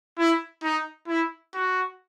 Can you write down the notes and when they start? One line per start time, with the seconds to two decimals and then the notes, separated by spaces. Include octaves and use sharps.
0.18 E4
0.63 D#4
1.08 E4
1.54 F#4